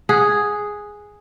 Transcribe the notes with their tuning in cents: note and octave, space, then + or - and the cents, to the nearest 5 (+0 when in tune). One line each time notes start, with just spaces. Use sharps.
G#4 +0 F#5 -10